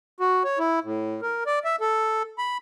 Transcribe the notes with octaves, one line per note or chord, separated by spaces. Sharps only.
F#4
C#5
E4
A2
A#4
D5
E5
A4
B5